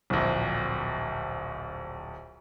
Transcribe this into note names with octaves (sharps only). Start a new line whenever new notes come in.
D1 A#1